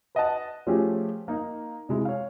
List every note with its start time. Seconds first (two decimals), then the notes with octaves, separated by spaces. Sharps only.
0.15 B4 D#5 F#5 A5
0.67 F3 A3 C#4 G4 G#4
1.28 A#3 D#4
1.89 C3 G#3 E4
2.05 C#5 F5